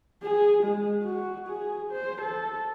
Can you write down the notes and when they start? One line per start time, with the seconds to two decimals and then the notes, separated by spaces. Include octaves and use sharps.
0.23 G#4
0.63 G#3
1.04 F#4
1.47 G#4
1.92 C5
2.21 A4